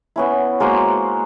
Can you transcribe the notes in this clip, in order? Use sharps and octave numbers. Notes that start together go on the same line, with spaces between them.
B3 C#4 E4
G#3 A#3 F#4 C5